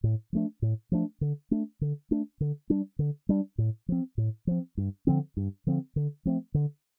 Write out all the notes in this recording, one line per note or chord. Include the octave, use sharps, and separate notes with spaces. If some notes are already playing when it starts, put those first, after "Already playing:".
A2
F3 A3 D4
A2
F3 A3 D4
D3
A3 D4
D3
A3 D4
D3
G3 D4
D3
G3 D4
A2
F3 C4
A2
F3 C4
G2
D3 F3 C4
G2
D3 F3 C4
D3
F3 A3 C4
D3